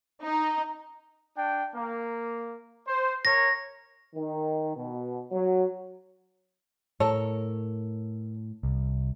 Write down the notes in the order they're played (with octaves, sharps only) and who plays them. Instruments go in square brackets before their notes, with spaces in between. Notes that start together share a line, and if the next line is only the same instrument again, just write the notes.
[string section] D#4
[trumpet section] D4 G5
A#3
C5
[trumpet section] A#4 C#5 [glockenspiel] A#6
[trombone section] D#3
B2
F#3
[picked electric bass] A2 [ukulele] A4 A#4 C#5
[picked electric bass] C2